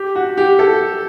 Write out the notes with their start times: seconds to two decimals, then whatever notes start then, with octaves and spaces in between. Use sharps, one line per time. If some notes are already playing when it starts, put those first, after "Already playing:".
Already playing: G4
0.15 F#4
0.37 G4
0.59 A4